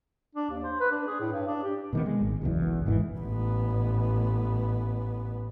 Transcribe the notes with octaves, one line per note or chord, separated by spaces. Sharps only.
D4
D#2
C5
B4
D4
G#4
A2
G2
D4
G4
B2 D#3 B3
G#3
G#1
F#1 B1 E2
G#1 G#2 D3 E3
A1 B3